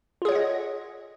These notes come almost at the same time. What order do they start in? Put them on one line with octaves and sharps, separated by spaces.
F4 G#4 C#5 F#5 D#5